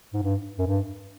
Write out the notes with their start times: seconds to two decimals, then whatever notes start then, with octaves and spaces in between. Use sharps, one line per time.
0.14 G#2
0.22 G2
0.58 F#2
0.67 G2